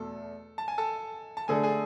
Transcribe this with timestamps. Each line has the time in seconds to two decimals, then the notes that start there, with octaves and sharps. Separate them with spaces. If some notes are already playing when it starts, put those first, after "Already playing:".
Already playing: E2 B2 A3 A4
0.58 A5
0.68 G#5
0.78 A4 A5
1.37 A5
1.48 D3 A3 D4 G#4 A4 G#5
1.63 G#4 G#5